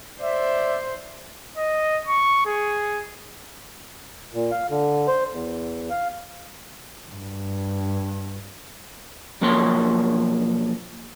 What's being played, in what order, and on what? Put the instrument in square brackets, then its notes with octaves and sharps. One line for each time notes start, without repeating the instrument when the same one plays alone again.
[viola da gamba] C5 [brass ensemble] D5 E5
[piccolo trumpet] D#5
C#6
G#4
[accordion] A#2
F5
D3
C5
E2
F5
[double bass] G2
[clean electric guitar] B1 F3 A#3 F#4 C#5 C6